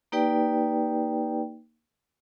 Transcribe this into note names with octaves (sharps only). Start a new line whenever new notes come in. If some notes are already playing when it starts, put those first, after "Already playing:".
A#3 D#4 G4 B4 D5 G5